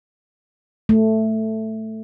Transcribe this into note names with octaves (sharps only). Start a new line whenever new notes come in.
A3